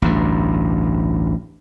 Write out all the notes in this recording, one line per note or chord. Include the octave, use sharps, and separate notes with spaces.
A1 D2 G2